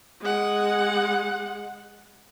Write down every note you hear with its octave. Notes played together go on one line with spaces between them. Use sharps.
G#3 F#5